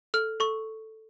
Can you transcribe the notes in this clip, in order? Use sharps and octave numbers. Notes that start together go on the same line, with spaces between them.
A4 F6
A4 C#6